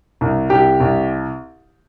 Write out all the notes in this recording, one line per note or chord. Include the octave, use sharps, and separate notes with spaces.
C2
C2 G4
C2